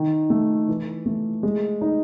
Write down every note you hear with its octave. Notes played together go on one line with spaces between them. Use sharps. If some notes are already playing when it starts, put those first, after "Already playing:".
Already playing: D#3
A3
E3
A3
G#3
D#4